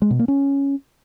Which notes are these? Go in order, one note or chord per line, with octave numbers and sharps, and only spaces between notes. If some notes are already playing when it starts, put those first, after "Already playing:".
G#3
B2
A#3
C#4